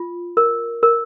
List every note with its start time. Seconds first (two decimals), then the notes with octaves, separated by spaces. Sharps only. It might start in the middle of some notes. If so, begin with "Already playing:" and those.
Already playing: F4
0.37 A#4
0.83 A#4